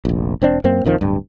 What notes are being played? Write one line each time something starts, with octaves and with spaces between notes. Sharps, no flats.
F1 A#1
E1 C4 D4
F#2 A#3 C4
A#1 F2 D#3 F3
D1 G2